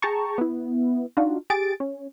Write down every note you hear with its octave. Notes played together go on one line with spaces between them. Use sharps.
G#4 G5 A5 A#5 C#6
B3 E4
D4 D#4 F4 F#4
G4 G#4 A6 D7
C#4